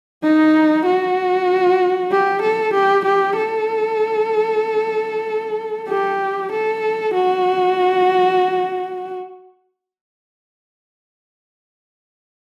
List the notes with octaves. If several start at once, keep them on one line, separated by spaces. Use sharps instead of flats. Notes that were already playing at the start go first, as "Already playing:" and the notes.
D#4
F#4
G4
A4
G4
G4
A4
G4
A4
F#4